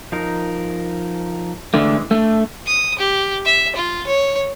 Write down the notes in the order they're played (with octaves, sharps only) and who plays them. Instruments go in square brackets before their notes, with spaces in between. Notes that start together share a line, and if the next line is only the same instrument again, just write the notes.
[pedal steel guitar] F3 D#4 A#4
[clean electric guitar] D3 A3 [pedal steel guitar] E3 G#3 D6
[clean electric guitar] A3 [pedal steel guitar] D4
[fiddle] D#6
G4
E5
F4
C#5